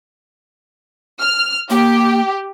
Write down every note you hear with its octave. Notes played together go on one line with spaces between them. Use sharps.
F6
A#3 G4